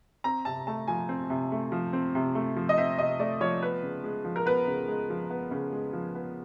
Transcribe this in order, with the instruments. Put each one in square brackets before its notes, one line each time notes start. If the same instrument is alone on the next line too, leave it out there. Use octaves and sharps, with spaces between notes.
[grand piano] C4 A#5
C3 A5
A3 A5
F3 G#5
C4
C3
A3
F3
C4
C3
A3
F3
D#5
C4 E5
C3 D#5
A3 D5
F3 C#5
B3 B4
C#3
G#3
F3
A#4
B3 B4
C#3
G#3
F3
B3
C#3
G#3
F3
B3